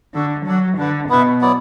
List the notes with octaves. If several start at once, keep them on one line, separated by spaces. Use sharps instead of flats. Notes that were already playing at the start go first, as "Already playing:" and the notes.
D3 D4 F#4 A4
F#3 D4 A4 D5 F#5
D3 D4 B4 F#5
B2 B3 E4 B4 E5
F#3 B3 E4 D5